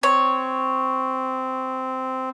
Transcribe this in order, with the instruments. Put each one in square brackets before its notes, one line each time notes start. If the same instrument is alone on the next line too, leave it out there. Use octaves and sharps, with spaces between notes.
[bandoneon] C4 [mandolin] C#5